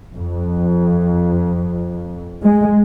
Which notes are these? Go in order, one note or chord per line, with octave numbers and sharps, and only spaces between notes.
F2
G#3